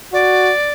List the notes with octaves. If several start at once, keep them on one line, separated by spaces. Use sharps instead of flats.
F#4 D5